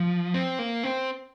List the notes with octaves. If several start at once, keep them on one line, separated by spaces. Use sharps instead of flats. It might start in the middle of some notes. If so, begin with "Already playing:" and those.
Already playing: F3
C4
A#3
C4